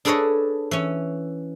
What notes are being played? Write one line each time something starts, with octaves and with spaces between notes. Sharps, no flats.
D4 G#4 A4 B4 C#5 D#5
E3 C#4